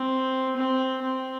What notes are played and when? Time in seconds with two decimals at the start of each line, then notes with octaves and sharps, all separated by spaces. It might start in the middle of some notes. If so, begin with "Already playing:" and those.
Already playing: C4
0.56 C4
1.03 C4